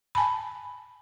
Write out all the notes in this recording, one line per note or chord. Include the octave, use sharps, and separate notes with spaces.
G#5 A5 B5